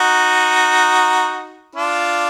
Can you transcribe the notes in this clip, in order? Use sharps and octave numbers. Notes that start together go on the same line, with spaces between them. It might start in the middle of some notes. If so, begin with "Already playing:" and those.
Already playing: D#4 F#4
D4 F4